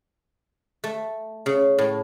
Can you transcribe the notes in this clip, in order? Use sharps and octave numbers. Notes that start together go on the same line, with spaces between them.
A3
C#3
A2